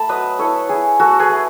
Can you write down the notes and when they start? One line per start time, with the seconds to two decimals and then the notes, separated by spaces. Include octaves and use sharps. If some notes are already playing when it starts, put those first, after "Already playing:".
Already playing: A3 A5 B5
0.09 F#3 B4 D#5
0.39 E4 A4 C#5
0.69 E4 G#4
1.00 A3 F#4 A4
1.20 G#4 B4
1.30 A3